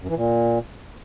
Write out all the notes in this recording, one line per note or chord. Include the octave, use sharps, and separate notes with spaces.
F#2
E3
A#2